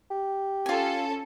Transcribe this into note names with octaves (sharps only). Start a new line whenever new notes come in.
G4
C#4 F4 A4 G#5